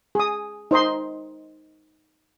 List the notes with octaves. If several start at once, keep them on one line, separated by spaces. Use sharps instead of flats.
G#4 D#6
D#4 C5 D#5 C6